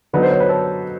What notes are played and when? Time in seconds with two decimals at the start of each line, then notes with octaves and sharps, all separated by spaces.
0.13 D3 F#3 B3 D#4 B4
0.23 C5
0.31 C#5
0.40 B4
0.49 A4